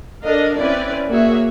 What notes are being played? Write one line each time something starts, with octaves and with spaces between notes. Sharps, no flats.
D4 A4 A#4 D#5 F5
C4 C#4 E4 B4 D5
A#3 F#4 G#4 C#5 E5